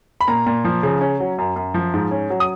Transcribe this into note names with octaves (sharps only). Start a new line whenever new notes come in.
B5
A#2 A#5
A#2
F3
C#3
C#4
F#3
F#2
F#2
F3
G#2
C#4
F#3
D#6